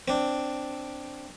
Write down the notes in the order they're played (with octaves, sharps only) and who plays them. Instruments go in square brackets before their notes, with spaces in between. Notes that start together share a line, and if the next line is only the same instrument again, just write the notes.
[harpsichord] C4 D4